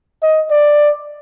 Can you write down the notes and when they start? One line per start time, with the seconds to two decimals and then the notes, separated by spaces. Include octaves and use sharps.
0.23 D#5
0.51 D5